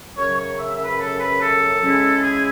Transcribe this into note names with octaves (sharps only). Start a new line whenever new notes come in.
F#2 C#3 F#3 C#5
C#5
E5
E5
B4
A4
B4
A4
C#3 G#3 C#4 E4
G#4